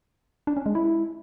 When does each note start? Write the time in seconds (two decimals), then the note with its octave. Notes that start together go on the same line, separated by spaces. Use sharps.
0.47 D4
0.57 C#4
0.66 G#3
0.75 E4